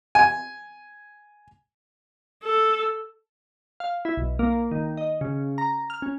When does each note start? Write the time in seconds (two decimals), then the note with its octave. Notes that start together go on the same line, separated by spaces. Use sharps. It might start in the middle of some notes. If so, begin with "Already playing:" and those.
0.15 G#5
2.43 A4
3.80 F5
4.05 E4
4.17 B1
4.39 A#3
4.71 D#3
4.97 D#5
5.21 C#3
5.58 A#5
5.90 F6
6.02 C#4